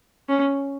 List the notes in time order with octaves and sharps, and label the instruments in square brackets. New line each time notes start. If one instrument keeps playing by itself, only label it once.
[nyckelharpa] C#4